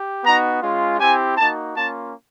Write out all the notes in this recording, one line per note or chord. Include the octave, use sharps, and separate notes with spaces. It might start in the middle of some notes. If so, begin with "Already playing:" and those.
Already playing: G4
B3 D#4 F#4 A#5
G#3 C#4 F4
C4 E4 G4 G#5
A#3 D#4 F#4 A5
A#3 C#4 F4 A5